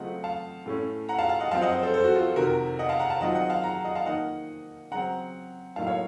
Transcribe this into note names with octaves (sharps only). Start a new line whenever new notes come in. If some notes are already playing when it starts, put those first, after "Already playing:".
Already playing: C#3 F#3 A3 C4 F4 D#5 F#5
F5 A5
A2 A3 C#4
F#5 A#5
F5 A5
F5 A5
D#5 F#5
F#2 F3 C4 F5 A5
D#5 F#5
C5 D#5
A4 C5
A4 C5
F#4
F4 A4
F2 C3 D#3 F#4 A#4
D#5 F#5
F5 A5
F#5 A#5
F5 A5
D#3 F#3 C4 F4 D#5 F#5
D#5 F#5
F5 A5
F#5 A#5
D#5 F#5
F5 A5
D#3 A#3 D#4 D#5 F#5
C#3 F#3 C4 F#5 A#5
A2 F#3 A#3 D#4 F5 A5
C#5 F5